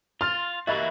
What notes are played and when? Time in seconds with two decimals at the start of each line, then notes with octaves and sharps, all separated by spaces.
0.21 F4 C6 F6 A6
0.67 E3 A#3 F#4 G4 A#4 D#5 E5 B5